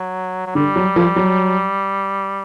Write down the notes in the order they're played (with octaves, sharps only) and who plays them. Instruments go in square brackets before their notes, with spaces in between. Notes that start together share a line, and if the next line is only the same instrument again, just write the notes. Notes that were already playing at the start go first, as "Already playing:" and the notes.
Already playing: [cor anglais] F#3
F#3
[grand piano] D3 [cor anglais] G3
[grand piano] F#3
F3
F#3